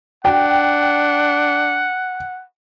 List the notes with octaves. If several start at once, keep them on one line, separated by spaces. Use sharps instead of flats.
D4 F#5 G5